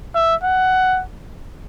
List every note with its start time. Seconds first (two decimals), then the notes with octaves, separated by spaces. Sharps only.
0.15 E5
0.43 F#5